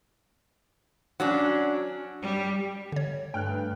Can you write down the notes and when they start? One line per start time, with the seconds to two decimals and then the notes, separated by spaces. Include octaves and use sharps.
1.20 F#3 C#4 D4
2.23 G3
2.92 D3 C#5
3.34 G2 A3 G5 F6 F#6